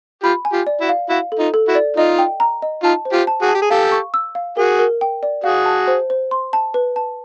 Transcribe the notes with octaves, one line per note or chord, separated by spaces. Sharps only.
F4 G4 B5
G#5
F4 G4
D5
E4 F#4
F5
E4 F#4 F5
A4
D#4 F4
A4
E4 F#4
D5
D#4 F4 D#5
G5
A#5
D#5
D#4 F4 A5
C5
F4 G4
A5
F#4 G#4
A5
G4
G#4
G4 A4 F5
C#6
E6
F5
F#4 G#4 A#4
A#4
G5
D5
F#4 G#4 F5
A5
C5
C5
C6
A5
B4
A5